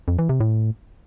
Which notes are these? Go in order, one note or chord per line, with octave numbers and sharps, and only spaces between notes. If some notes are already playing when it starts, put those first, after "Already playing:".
F2
E3
C3
A2